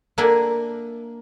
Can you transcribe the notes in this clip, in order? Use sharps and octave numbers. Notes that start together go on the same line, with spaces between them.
A#3 D4 A#4 E5 F#5 G#5